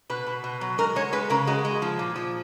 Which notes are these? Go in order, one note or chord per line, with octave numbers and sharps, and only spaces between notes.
B2 B4
B2
B2
F#3
G#3 A#4
G#3 C#5
G#3 B4
C#3 A#4
G#3 F#4
G#3
F3
A#2
F3